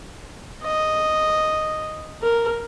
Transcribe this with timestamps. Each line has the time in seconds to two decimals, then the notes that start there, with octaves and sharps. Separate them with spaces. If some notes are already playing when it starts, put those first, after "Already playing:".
0.63 D#5
2.22 A#4